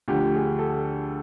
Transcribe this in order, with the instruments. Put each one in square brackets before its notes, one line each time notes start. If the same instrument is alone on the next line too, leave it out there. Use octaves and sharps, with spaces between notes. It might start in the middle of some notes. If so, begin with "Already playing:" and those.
[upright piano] D2 D3 F3 G4
G#4
A4